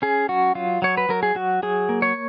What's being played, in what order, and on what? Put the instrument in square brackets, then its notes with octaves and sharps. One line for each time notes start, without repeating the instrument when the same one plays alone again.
[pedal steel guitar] C#4 G#4
F#3 F#4
F#3 F4
F#3 C#5
B4
F#3 A#4
G#4
F#3 F#4
F#3 G#4
A#3
C#5